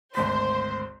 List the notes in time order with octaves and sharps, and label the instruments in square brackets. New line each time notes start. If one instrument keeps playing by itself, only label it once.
[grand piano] G#1 D2 B6 [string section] C5 [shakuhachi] C6